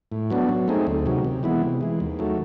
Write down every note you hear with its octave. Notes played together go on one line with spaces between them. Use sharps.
A2
F#3 B3 D4
F#3
A3 C4 D#4 G#4
D2
C3 D#3 F#3
C3
E3 G#3 B3 E4
C3
E3 G#3
D#2
D#3 F#3 A3